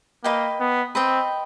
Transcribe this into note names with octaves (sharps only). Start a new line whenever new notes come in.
A#3 B4 D#5 G5
B3
C4 B4 D#5 G5